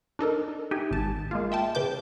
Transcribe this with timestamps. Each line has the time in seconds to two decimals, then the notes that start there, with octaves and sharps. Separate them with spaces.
0.19 D4 D#4 A4 A#4
0.71 D#4 G4 E5 G5 G#5
0.91 G#1 A5
1.31 G#3 A#3 F4
1.52 E5 G5 A5
1.75 C#3 B4 D6 G6